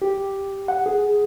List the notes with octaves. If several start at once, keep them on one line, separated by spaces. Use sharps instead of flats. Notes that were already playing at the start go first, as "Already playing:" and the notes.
G4
F#5
G#4